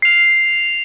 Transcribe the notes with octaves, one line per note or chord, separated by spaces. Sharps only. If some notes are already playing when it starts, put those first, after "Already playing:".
C7 F7